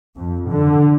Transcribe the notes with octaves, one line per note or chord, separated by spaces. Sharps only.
F2
D3